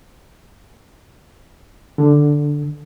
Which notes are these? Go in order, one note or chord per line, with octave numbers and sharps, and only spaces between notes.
D3